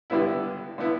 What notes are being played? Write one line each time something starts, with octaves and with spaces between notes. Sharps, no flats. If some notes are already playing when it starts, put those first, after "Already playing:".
G2 D3 B3 E4
D3 B3 E4